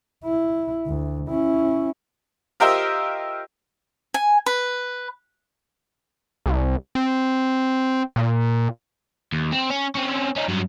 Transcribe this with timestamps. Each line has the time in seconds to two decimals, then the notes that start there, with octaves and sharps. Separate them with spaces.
0.24 E4
0.87 D2
1.28 C#4 E4
2.60 F4 G4 A#4 C5 D#5 E5
4.14 G#5
4.46 B4
6.46 C2
6.95 C4
8.16 A#2
9.32 D#2
9.52 C4
9.70 C#4
9.95 C4 C#4
10.36 C#4 D#4
10.48 G2 F#3